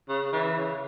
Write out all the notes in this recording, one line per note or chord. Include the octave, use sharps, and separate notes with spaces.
C#3
E3
C#3